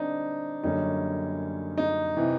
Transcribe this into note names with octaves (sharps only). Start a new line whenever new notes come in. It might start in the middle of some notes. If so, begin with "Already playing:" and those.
Already playing: D3 G3 C4 D4 D#4
F#2 D3 G3 A#3 C#4 D#4
D#4
C3 E3